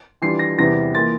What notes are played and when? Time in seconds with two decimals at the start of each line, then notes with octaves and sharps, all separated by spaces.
0.22 E3 G3 D4 F4 C7
0.39 A#6
0.58 E2 C3 E3 G3 A#6
0.94 E3 A#3 F4 A6